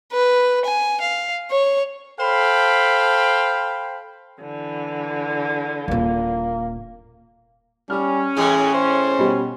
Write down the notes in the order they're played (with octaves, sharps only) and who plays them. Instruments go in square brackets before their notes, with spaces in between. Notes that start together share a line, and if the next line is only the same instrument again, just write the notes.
[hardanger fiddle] B4
G#5
F5
C#5
[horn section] A4 C5 F5 G5 B5
[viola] D3 E3
[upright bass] D#1 A#2 [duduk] A#3
[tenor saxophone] G3 [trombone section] C#4 [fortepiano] F6
[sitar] A2 E3 G#3 [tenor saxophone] G#4
[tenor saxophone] C5
[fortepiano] B2 G3 G4